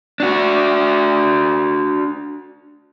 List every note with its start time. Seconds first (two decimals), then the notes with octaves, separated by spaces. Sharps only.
0.20 D4 F#4